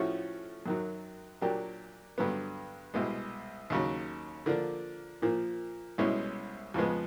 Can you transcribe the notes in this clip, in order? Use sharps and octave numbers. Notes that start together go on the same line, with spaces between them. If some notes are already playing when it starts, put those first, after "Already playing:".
Already playing: A2 F3 A3 C#4 F#4
F#2 D#3 F#3
A#2 F#3 A#3 D4 G4
G2 D3 F#3 B3
C2 B2 G#3
D#2 C#3 F#3
D3 F3 A#3 D4
A#2 F3 A#3
C2 B2 G#3 C#4 E4
F2 C#3 F3 G#3 B3